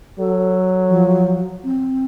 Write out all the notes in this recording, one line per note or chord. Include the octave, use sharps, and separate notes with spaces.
F#3 A4
F3
C4